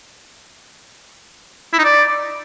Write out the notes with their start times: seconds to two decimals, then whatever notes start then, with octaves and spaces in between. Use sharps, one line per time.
1.73 E4
1.79 D#4
1.84 D5